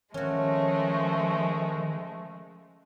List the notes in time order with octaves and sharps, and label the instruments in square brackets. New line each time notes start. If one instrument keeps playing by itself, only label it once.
[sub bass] D#3 [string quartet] F3 G#3 A3 [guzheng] C#4 F#4